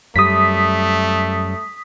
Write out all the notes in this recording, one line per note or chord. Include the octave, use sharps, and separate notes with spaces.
F#2 G3 A3 D#6 B6